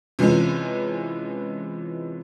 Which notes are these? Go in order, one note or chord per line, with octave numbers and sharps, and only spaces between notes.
C3 E3 F3 G#3 C#4